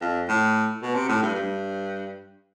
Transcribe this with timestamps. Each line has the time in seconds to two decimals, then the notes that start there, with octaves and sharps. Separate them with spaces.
0.01 F2
0.29 A2
0.82 B2
0.95 C3
1.09 A2
1.22 G2
1.35 G2